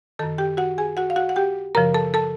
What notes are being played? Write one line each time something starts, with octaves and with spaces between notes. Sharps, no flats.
F#2 D#3 A4 A5
G4 G5
F#4 F#5
G#4 G#5
F#4 F#5
F5
F#4 F#5
F#5
G4 G5
F#2 C#3 F3 A#4 A#5
A4 A5
A4 A5